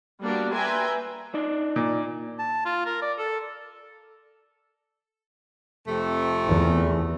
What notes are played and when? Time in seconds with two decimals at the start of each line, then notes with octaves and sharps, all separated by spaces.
0.21 G3 A#3 B3 D4 F#4 G4
0.52 B4 E5 G5 G#5 A#5 C6
1.34 D4 D#4 D5
1.76 A#2
2.39 A5
2.65 F4
2.86 A#4
3.02 D5
3.18 A4
5.88 F2 C3 A3
6.47 E2